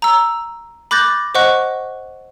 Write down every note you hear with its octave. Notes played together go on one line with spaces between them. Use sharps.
A#5 E6
B5 D6 F#6 G6 A6 A#6
C5 D#5 F#5 C#6 F#6